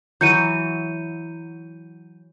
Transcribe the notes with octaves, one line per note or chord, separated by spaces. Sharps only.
E3 F#3 G6 C#7 D#7